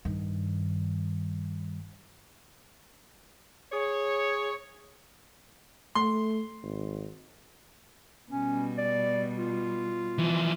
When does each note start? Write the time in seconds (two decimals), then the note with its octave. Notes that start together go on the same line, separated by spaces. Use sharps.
0.05 G2 D#3
3.73 G#4 C#5
5.95 A3 C6
6.63 G#1
8.31 B2 G3 C#4
8.78 D5
9.38 F4
10.18 E3 F3